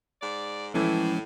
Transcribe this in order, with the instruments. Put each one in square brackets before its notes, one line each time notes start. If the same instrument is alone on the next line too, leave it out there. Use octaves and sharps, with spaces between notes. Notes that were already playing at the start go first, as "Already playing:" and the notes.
[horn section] G#2 D5
[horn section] A2 [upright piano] E3 A3 [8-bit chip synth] F3 G#3 C#4